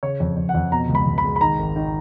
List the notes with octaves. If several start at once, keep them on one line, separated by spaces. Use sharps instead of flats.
C#3 C#5
F2
F2
F#5
F2
B2 A#5
C#2
B5
C#2
B5
G#3
B5
D#3 A#5
G#1
D#3